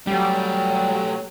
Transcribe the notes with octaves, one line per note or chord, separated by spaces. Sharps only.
F#3 G3 A3 G4